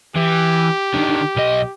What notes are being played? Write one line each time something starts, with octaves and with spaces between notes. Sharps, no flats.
E3 G4
D3 D#3
B1 D#5